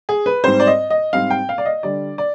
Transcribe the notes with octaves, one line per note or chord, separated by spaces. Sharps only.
G#4
B4
G#2 G3 C4 C5
D5
D#5
D#5
G#2 G3 C4 F5
G5
F5
D5
D#5
D3 G3 D4 D5
D5